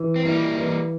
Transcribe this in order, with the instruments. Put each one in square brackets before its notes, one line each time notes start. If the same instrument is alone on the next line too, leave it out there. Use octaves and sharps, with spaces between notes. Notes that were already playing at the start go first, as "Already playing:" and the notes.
Already playing: [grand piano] E3
[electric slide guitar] C4
[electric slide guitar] G3 A#3 [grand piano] E4
[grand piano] E3